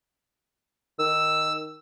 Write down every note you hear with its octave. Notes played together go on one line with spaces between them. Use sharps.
D#3 E6